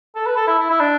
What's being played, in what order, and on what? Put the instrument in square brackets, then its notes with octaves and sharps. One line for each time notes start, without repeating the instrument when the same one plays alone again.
[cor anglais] A4
B4
A4
E4
E4
E4
D4